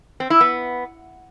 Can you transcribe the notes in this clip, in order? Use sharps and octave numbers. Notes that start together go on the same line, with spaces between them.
C4
E4
B3